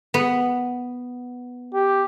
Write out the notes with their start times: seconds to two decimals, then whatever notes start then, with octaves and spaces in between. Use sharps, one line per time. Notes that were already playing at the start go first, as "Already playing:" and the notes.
0.14 B3
1.74 G4